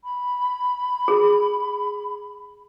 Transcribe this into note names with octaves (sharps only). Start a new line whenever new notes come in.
B5
G#4